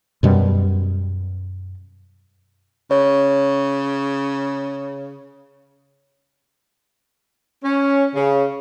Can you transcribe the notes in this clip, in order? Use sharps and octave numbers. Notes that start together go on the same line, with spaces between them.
F#2 B2 G3
C#3 C#5
C#4
C#3